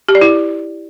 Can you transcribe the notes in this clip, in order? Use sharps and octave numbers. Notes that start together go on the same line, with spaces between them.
G4
D5
E4